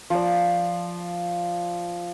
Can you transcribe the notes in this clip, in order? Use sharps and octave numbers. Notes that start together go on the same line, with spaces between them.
F3 D5